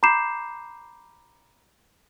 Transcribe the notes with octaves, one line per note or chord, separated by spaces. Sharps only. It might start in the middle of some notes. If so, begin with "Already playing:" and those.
A#5 B5 D6 G6 C7 E7